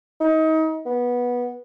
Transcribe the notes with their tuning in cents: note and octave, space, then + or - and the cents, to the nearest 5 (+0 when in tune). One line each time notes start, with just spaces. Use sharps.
D#4 +30
B3 -15